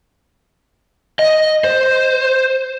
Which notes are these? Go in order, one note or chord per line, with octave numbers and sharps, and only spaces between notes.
D#5
C5